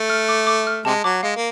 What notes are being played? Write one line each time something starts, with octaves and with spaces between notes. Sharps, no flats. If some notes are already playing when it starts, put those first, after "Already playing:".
Already playing: A3
F6
D6
D6
F6
C3 G#3 A5
F#3 D6
G#3 F5
A#3